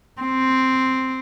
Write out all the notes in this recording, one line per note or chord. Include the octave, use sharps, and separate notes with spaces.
C4